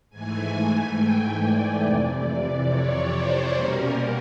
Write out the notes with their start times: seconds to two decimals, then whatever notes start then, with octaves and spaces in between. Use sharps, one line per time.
0.10 G#2 E3 A3 G#5
0.96 G5
1.39 D5
1.81 F2 C3 E3
2.67 C#5
3.09 C5
3.52 B2 G3 A#3 C#4 A#4